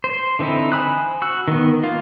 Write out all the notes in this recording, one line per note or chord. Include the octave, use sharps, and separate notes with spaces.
C5
D3 E3 C4 D#4 E4
C5 G#5 B5 D#6 F#6
F#4 E6 F#6
D#3 B3
A#3 F4